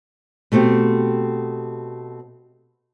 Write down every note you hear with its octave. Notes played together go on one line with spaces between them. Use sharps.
B2 A3 C4 G4 F#5